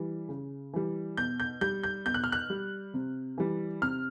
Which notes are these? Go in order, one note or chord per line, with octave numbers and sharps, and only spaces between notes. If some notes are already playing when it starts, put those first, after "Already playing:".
Already playing: E3 G3
C#3
E3 G3
B2 G6
G6
G3 G6
G6
B2 G6
F#6
F6
F#6
G3
C3
E3 G3
C3 F6